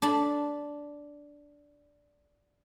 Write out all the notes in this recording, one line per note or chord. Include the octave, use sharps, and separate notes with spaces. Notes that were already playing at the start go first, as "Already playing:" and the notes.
D4 A5 B5